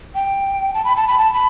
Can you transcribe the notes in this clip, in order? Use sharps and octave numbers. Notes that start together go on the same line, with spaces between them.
G5
A5
B5
A5
B5
A5
B5